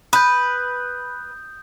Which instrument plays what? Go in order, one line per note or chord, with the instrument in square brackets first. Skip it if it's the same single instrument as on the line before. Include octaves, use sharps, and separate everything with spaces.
[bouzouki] B4 [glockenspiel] D#6 G6